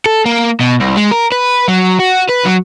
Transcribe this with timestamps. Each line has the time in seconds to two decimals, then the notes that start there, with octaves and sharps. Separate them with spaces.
0.06 A4
0.26 A#3
0.60 B2
0.80 C2
0.97 G#3
1.11 A#4
1.32 B4
1.68 F#3
2.00 F#4
2.29 B4
2.45 F#3